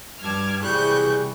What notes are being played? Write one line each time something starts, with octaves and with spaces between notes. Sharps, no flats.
G2 A5 D6 F6 G#6
C3 E3 G3 G#4 C#6 F#6 G6